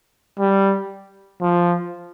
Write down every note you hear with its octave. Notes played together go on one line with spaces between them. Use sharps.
G3
F3